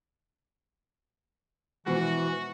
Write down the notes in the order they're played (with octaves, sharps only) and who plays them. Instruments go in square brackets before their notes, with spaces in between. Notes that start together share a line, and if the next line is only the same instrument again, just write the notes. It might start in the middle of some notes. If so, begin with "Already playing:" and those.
[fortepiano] B2 F3 [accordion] E3 [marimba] G#3 [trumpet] F#4